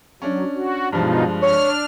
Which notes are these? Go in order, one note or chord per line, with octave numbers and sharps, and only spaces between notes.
F#3 C#4 D4
F#4
G2 B2 F3 G#3 D#4 F4
D4 C#5 F6